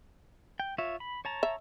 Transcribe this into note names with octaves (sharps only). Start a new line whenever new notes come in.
G5
F4 C#5 E5
B5
C#5 A5 A#5
E5